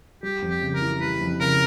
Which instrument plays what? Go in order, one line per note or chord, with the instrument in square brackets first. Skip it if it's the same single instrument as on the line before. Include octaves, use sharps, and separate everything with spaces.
[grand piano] G3 [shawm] G4
[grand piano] F2
[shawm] G4
[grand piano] C#3
[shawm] A#4
[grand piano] E3
[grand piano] G3 [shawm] B4
[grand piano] F2
[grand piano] C#3 [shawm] A#4